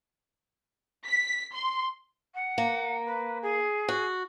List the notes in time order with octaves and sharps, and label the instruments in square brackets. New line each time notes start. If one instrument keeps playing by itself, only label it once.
[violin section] B6
C6
[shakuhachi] F#5
[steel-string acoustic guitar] A#3
[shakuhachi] B4
G#4
[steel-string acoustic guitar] F#4